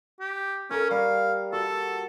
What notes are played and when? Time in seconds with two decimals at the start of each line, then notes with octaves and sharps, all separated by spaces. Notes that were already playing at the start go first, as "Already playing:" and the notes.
0.20 G4
0.71 C#4 A#4
0.91 G3 F5
1.52 F#4 A4